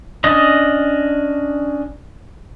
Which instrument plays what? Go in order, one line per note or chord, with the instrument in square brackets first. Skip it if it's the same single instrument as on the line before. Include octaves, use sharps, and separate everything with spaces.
[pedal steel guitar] C#4 D4 D#5